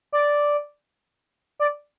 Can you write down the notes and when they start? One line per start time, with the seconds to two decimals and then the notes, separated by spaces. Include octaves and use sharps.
0.12 D5
1.60 D5